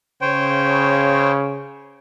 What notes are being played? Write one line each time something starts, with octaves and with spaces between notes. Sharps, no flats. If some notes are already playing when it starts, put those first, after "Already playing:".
C#3 C5 C#5 G5